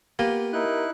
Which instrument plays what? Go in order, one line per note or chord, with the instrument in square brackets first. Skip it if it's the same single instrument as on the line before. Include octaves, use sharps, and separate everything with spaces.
[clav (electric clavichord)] A#3 [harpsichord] B3 F4 G4
[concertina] D#4 E4 F#6 [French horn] A#4